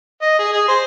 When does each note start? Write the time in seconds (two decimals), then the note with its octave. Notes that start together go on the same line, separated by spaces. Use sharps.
0.22 D#5
0.39 G#4
0.53 G#4
0.68 C5